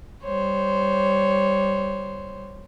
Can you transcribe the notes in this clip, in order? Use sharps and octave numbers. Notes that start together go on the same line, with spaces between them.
G3 C5 C#5